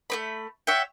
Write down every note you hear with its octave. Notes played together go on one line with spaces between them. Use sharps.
A3 C4 B5
C#5 E5 F#5 G5